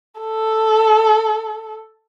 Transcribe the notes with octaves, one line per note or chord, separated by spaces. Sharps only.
A4